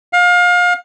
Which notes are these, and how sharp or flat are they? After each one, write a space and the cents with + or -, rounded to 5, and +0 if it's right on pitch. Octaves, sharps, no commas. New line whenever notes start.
F5 +30